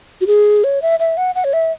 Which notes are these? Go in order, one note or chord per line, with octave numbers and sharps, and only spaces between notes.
F#4
G#4
C#5
E5
E5
F#5
F#5
C#5
E5